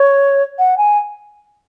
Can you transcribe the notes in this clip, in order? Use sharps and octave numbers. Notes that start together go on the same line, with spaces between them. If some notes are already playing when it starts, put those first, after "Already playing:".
Already playing: C#5
F#5
G#5